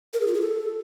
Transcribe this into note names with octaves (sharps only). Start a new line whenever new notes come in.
A#4
G#4
F4
G#4
A4